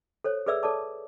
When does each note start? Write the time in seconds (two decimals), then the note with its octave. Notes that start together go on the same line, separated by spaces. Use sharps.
0.24 A4 C5 C#5
0.46 G#4 A4 B4 D5 E5 E6
0.63 A4 C#5 D5 A5 D6